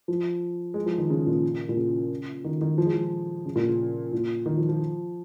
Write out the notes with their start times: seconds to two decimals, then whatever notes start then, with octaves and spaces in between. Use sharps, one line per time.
0.08 F3
0.74 G#3
0.86 F3
0.98 D#3
1.10 C#3
1.27 A#2
1.69 A#2
1.77 C#3
2.44 D#3
2.61 D#3
2.78 F3
2.85 G#3
2.93 F3
3.46 C#3
3.56 A#2
3.67 C#3
4.13 A#2
4.46 D#3
4.57 F3
4.69 F3